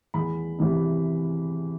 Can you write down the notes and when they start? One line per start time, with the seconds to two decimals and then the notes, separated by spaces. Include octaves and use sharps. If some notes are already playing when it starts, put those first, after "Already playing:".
0.14 E2 B5
0.59 C3 E3